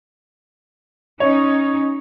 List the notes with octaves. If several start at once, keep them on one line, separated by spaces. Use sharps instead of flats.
C#4 D#4 C#5